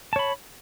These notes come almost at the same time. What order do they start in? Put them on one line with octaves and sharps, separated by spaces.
A5 C#5 B5